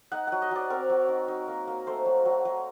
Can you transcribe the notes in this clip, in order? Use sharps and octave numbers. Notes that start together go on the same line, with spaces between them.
D#4 F#5
F#3 F#5
D#5
F#3 D5
C4 A#4
F#3
D#4
D#4
A#3
A#3
A3 C5
F#3
F#3
F#3